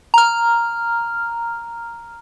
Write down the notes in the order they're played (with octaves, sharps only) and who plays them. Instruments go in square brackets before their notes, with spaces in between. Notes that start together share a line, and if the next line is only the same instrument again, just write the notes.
[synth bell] A#5 F6